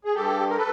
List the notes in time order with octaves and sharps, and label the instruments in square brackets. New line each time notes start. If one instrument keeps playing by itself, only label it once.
[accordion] G#4
G2 G4 A4
A#4
A4 B4